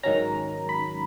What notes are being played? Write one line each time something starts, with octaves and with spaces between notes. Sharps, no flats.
G#2 D#3 F#3 C#4 A#5
B5